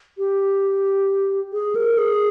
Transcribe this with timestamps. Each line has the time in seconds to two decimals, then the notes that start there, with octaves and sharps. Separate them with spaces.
0.18 G4
1.53 G#4
1.75 A#4
1.98 G#4